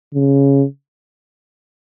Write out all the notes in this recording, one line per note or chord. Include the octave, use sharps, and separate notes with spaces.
C#3